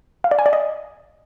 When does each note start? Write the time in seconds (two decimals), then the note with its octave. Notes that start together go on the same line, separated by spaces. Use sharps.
0.24 F5
0.31 D5
0.39 G#5
0.46 D5
0.53 D#5